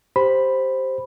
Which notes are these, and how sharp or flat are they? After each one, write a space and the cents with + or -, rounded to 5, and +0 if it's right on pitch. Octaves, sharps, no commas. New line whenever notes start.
G4 +0 C5 +0 B5 +0